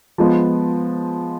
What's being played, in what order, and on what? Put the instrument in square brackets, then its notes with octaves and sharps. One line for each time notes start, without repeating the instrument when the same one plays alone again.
[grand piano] F3 G#3 B3